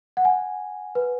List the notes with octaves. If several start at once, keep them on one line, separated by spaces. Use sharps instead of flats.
F#5
G#5
B4